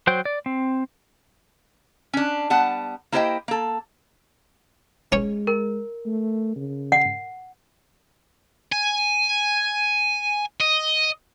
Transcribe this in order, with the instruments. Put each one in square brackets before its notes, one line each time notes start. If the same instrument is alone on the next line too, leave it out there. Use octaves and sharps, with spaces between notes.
[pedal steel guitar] F#3 C5 G5
D5
C4
[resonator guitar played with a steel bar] C#4 D4
G3 B3 F#5 A5
A#3 E4 G4 C5 D#5 G5
A#3 A4
[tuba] G#3 [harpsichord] C#4 C#5
[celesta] A#4
[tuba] A3
C#3
[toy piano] F#5
[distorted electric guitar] G#5
D#5